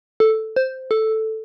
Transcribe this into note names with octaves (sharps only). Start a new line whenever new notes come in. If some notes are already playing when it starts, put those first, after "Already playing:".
A4
C5
A4